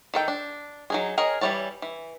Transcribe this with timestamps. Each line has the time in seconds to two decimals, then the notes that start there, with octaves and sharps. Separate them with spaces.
0.14 D#3 A4 G5
0.28 D4
0.90 F#3 D#4 G#4
1.18 G#4 A#4 C#5 D#5 G#5
1.41 E3 F3 G3 C#5 A5
1.82 E3